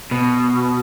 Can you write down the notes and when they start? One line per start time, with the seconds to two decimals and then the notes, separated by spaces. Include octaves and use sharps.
0.11 B2